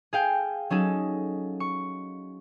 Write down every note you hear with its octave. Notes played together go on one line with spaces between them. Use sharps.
G#4 F5 G5
F#3 C#4 D#4 G#4 A4
C#6